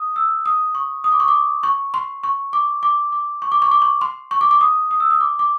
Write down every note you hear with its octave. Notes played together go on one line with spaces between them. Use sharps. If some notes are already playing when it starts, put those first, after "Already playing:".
Already playing: D#6
E6
D#6
C#6
D#6
D6
C#6
D6
C#6
C6
C#6
D6
D6
D6
C#6
D6
C#6
D6
C#6
C6
C#6
D6
D6
D#6
D#6
E6
D#6
D6
D6